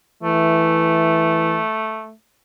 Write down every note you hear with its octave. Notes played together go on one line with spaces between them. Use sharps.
E3 A3